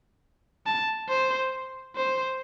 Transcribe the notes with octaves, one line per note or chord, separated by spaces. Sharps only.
A5
C5
C5